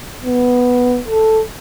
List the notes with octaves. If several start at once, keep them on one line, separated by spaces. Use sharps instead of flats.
B3
A4